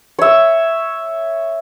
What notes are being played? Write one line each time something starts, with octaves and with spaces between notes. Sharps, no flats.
C#5 E5